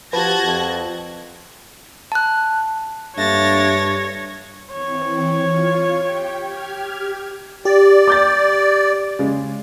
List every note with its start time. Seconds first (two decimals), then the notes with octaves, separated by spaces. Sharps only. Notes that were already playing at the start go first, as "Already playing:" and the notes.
0.13 F3 F#4 G4 B4 A5 F#6 G#6 A#6
0.45 F2
2.12 A5 F#6
3.18 G2 A3 A#3 D4 C#5 A6 A#6
4.72 E3 C4 C#5
5.38 F4
5.99 G4 G5
6.41 G4 F6 G#6
7.65 G4 D5
8.08 D6 G6 A6
9.19 C#3 G#3